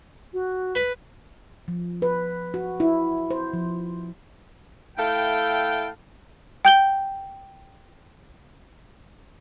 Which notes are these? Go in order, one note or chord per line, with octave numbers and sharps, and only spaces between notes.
F#4
B4
F3
B4
F#4
E4
C5
F3
A3 E4 A4 F5 G5
G5 G6 G7